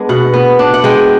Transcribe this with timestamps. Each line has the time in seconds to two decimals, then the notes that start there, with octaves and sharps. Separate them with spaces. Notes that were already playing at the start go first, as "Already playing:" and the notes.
Already playing: G#3 B3 D4
0.09 B2 F#5
0.34 B3
0.59 D4
0.74 F#5
0.84 G#3 G5